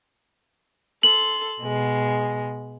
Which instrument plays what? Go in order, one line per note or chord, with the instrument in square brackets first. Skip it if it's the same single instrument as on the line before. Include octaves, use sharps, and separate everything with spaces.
[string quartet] A4 C6 [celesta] F#7
[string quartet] B2 G#3